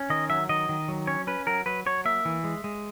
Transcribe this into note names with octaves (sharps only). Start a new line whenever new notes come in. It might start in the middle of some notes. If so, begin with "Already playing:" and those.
Already playing: C#4
D#3 D#5
F#3 E5
D#3 D#5
D#3
F#3
C#4 C#5
C#4 B4
F#3 A#4
F#3 B4
F#3 C#5
A#3 E5
E3
G#3
G#3